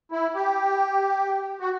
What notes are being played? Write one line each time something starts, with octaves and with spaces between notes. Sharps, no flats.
E4
G4
F#4